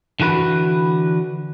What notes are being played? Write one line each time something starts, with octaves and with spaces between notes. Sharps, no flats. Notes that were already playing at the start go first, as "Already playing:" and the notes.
D3 E3 F#4 B4